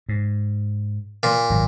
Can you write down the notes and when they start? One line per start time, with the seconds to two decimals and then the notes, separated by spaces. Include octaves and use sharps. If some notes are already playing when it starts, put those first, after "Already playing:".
0.09 G#2
1.23 A#2
1.50 G#1 F#3